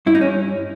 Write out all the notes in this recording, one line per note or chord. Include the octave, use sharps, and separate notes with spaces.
G2 E4
D#4
C#4